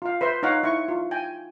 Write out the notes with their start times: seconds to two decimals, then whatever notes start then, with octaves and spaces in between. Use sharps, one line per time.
0.02 F4 F5
0.21 B4 C5 E5 C6
0.43 D#4 C#5 F5 F#5
0.63 E4 C#6
0.88 F4
1.11 G5 G#5